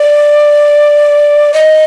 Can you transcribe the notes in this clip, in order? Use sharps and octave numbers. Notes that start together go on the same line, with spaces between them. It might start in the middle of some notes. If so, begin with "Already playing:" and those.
Already playing: D5
D#5